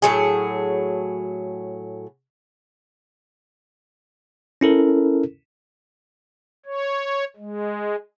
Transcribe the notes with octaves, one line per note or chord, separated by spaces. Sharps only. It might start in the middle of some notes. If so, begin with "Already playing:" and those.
A2 F#3 G#4
C#4 E4 A4 A#4
C#5
G#3